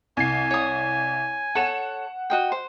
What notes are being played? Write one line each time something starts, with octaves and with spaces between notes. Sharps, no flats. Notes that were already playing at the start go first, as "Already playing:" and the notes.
C2 G#5 C7
C#5 D#6
A4 C#5 F#5 E7
F#4 D#5 G5
C5